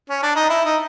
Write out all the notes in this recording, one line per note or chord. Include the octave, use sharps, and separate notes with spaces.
C#4
D4
D#4
E4
D#4